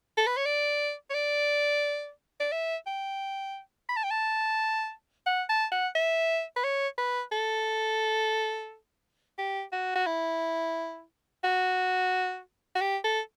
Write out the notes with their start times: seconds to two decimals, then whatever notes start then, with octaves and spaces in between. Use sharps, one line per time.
0.17 A4
0.27 B4
0.37 C#5
0.45 D5
1.10 C#5
1.14 D5
2.40 D5
2.52 E5
2.87 G5
3.89 B5
3.97 A5
4.04 G5
4.11 A5
5.26 F#5
5.49 A5
5.71 F#5
5.95 E5
6.56 B4
6.64 C#5
6.98 B4
7.32 A4
9.38 G4
9.72 F#4
9.95 F#4
10.06 E4
11.44 F#4
12.75 F#4
12.81 G4
13.04 A4